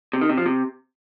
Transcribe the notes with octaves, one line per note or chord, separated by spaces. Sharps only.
C3
D#3
C3
F3
C3